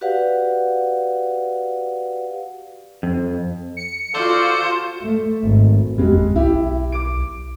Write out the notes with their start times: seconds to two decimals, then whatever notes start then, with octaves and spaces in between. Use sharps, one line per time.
0.01 F#4 G4 B4 D5 F5 F#5
3.03 F2
3.77 C#7
4.15 F4 F#4 A4 C5 D5 F5
5.02 A3
5.44 G#1
5.98 E2 G3 G#3 F#4
6.16 G1
6.36 B1 E4 G4
6.92 D6 D7